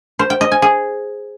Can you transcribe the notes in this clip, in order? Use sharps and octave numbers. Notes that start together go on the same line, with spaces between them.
C5
G5
D#5
G#5
G#4